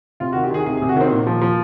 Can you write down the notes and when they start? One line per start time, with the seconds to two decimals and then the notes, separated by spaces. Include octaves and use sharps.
0.20 C3 F4
0.33 D#3 F#4
0.44 G4
0.51 D#3 G#4
0.66 C3 G#4
0.77 G#4
0.82 C3
0.89 F#4
0.96 D#3 C4
1.12 A#2
1.27 F3
1.41 F3